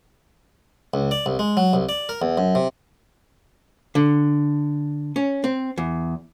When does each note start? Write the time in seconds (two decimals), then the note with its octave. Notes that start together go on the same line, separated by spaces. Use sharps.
0.94 C#2
1.11 D5
1.26 C2
1.39 G#3
1.57 F#3
1.73 C2
1.89 D5
2.09 A#4
2.22 E2
2.38 F#2
2.55 C3
3.95 D3
5.16 C#4
5.44 C4
5.78 E2